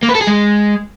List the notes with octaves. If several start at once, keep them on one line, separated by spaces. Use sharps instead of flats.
A#3
B4
A4
G#4
G#3